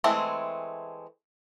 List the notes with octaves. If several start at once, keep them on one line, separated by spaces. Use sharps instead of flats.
E3 G#3 A3 C4